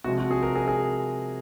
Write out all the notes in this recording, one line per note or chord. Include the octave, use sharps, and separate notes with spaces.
C3 F3 G#3 F#4
F#4
G#4
A#4
G#4
G#4